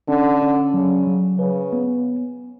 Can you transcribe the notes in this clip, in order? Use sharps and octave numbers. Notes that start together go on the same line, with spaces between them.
D3 C#4
C#4
C#3 F#3
F#3
C#3 B4
B3